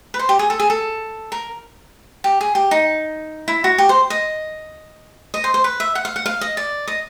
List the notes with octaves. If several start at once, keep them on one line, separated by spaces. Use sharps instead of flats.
B4
C5
G4
G#4
A4
G#4
A4
A#4
G4
G#4
G4
D#4
E4
F#4
G4
C5
D#5
D#5
C5
C5
B4
E5
F#5
F5
F#5
F5
D#5
D5
D#5